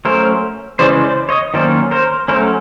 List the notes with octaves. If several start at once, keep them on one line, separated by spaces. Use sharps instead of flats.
F#3 A3 C#4 A#4 C5
C#3 E3 G#3 C#4 C5 D5
C5 D5
C#5 D#5
D#3 F#3 A#3 C#4 C5 D5
A#4 C5
F#3 A3 C#4 A#4 C5